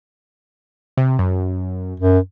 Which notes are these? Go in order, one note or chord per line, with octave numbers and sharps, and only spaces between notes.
C3
F#2
F#2